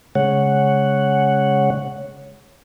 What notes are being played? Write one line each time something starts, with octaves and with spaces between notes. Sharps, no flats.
C#3 G#3 C#5 F#5